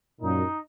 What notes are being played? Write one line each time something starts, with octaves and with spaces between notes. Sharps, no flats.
F#2 A#2 D#4